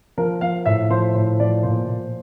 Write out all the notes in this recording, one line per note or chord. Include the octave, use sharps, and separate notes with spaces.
F3 A#4
F3 F5
A2 E5
F3 C5
A2 C5
F3 D5
A#2 C5
A#2